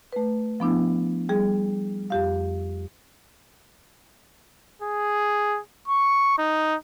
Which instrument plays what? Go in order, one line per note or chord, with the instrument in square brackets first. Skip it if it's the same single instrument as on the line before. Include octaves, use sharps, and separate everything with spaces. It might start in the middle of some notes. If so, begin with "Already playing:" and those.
[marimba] A3 B4
F3 B3 D4 E4
G3 G#4
F2 G4 F5
[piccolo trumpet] G#4
C#6
D#4